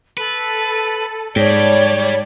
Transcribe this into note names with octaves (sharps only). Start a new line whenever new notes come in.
A4 B4
G#2 G3 C#5 D5 G5 A5